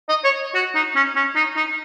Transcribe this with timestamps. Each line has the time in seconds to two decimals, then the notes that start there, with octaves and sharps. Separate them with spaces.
0.09 D#5
0.24 C#5
0.55 F#4
0.75 D#4
0.96 C#4
1.16 C#4
1.36 D#4
1.57 D#4